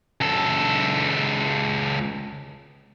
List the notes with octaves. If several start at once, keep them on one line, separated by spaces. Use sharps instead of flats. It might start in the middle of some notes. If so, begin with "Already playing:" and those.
C#2 A4